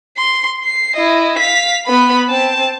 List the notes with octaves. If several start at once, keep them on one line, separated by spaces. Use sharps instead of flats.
C6
C7
E4 D#5
F5 B6
B3 B5
C4 A5